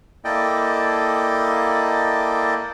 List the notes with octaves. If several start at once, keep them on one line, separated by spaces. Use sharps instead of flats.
A#3 E4 A4 D5 D#5 G5